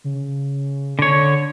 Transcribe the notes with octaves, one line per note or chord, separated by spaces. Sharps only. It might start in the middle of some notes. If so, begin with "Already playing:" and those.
C#3
D3 C#5